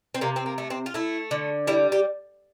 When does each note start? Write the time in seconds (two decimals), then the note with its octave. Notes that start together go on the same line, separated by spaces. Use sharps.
0.14 C4
0.21 C3 A#3
0.36 C4
0.46 A#3
0.58 A3
0.70 C4
0.86 F4
0.94 A3 E4
1.31 D3
1.67 G3 E4
1.92 G4